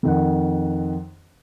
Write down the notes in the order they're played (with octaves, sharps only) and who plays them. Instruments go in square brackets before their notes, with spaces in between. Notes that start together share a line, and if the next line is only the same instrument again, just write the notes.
[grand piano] F2 D#3 F#5